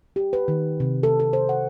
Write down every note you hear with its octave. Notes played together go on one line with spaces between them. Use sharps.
G4
B4
D#3
C3
A4
A4
C5
F#5